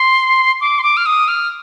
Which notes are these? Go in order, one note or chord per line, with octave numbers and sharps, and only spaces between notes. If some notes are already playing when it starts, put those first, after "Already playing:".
Already playing: C6
D6
C6
D6
F6
D#6
F6